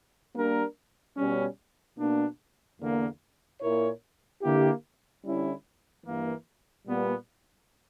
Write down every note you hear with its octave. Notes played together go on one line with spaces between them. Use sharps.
G3 A#3 D4 A#4
B2 G3 C#4
B2 A#3 D4
E2 D3 A#3
A#2 A#3 E4 A#4 C#5
D3 A#3 E4 G4
D3 G3 C#4 E4
G2 E3 A#3
A#2 G3 B3